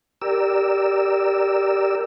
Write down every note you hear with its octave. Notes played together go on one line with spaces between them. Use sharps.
G4 A#4 D5 E6